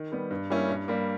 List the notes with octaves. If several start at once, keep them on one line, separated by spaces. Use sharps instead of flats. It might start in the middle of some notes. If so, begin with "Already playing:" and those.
Already playing: D#3
G3 B3
G2
G3 A#3 C#4 E4
G2
G3 A#3